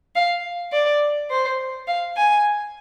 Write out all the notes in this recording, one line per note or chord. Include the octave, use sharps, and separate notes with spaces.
F5
D5
C5
F5
G#5